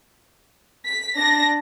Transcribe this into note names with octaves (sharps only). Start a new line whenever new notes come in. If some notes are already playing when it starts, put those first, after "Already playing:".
B6
D4 A#6